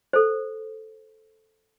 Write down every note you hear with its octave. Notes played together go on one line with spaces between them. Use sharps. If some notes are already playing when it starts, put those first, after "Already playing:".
A4 C5